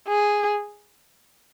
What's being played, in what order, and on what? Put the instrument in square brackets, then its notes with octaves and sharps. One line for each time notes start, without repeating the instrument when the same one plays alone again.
[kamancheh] G#4